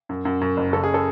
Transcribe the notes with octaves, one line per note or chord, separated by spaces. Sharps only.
F#2
F#2
F#2
F#1
C#3 A4
G#4
A4